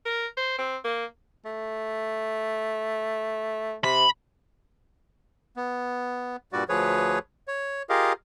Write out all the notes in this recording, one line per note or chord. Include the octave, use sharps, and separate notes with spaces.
A#4
C5
C4
A#3
A3
C3 B5
B3
G2 A#2 G3 F#4 D5
D2 F3 G#4 B4 C#5
C#5
F4 G4 G#4 A#4 D#5 F5